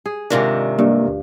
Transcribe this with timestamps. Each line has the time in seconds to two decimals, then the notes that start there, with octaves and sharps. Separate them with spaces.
0.06 G#4
0.30 G#2 C3 D#3 D4 F4 G4
0.79 G2 A#3
1.08 D2